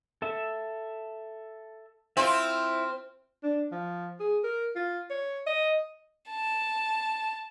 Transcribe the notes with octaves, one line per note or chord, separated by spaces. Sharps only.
A4 E5
C4 E4 F4 E5
D4
F3
G#4
A#4
F4
C#5
D#5
A5